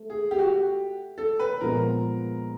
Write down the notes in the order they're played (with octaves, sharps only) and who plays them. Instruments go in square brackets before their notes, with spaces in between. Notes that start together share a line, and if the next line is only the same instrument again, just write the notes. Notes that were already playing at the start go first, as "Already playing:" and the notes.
Already playing: [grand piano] A3
[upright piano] G#4
G4
F#4
G4
A4
B4
[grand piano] A#2 F3 G#3 B3 [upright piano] A#4